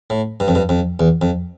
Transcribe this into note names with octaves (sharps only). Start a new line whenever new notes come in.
A2
G2
F2
G2
F2
E2
F2